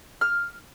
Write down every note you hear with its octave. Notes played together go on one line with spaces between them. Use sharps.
F6